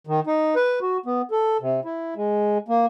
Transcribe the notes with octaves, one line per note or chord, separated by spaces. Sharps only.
D#3
D#4
B4
F#4
B3
A4
C3
E4
G#3
A#3